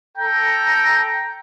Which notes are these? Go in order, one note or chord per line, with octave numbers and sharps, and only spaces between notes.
A4 G5 A#5